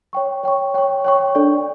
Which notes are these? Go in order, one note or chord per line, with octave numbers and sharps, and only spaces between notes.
C#5 G5 C#6
C#5 G5 C#6
C#5 G5 C#6
C#5 G5 C#6
D4 A4 D5